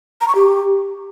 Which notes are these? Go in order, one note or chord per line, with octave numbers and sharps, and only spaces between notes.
A#5
C#6
G4